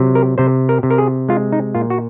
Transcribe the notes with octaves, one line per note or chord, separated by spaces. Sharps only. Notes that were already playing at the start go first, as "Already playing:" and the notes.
Already playing: C3 F#3
A#4
C3 C5
A#4
C3
A#4
G#4
G#3 F4
D#4
A#2 F4
F#4